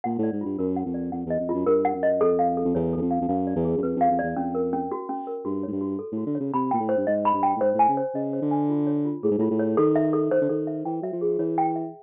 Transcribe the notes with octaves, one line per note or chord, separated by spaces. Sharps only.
A#2 F#5
A2 D5
G#2
G2 F4
F#2 A#4
F#5
F2
D5
F2 F#5
E2 D#5
F2
F#2 F4
G2 A#4
F#5
F#2
D#5
F2 A4
F5
A4
F2
E2 C#5
E2 A4
F2
F5
F2
F#2 F5
D5
E2
G#4
F#2
F2 B4
F2 F5
F2
E2 D5
F2 C#4
A#4
C#4
F#4
C#4
A#4
G2 F#4
G#2 C#5
G2
F#4
A4
A2 F#4
D3
C#5
C#3
C3 B5
A#2 G5
A2
C5
G2
G#2 D#5
B5
G2
G5
A2
G#2 C5
A2 G#5
C#3
C5
C#3 D#5
C5
D3
G#5
F4
C#5
F4
A2 G#4
G#2
A2 F4
A2
C#5
D#3 A4
E5
A4
D#3 C5
D3
D#3 A4
E5
E3 G5
F#3 E5
F3
G#4
E3 C#5
G5
E5